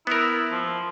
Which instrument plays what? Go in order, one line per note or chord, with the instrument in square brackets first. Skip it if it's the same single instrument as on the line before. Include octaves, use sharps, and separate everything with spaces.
[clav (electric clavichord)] B3 A#4 [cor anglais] E4
[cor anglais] F3